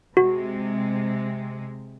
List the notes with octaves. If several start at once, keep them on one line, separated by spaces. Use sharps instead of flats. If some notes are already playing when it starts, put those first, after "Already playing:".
C3 G#3 F#4